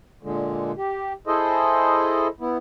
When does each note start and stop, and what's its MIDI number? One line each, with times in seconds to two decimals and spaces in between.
0.23 0.72 46
0.23 0.72 50
0.23 0.72 56
0.77 1.13 67
1.27 2.28 64
1.27 2.28 68
1.27 2.28 69
1.27 2.28 72
1.27 2.28 75
2.40 2.57 59
2.40 2.57 64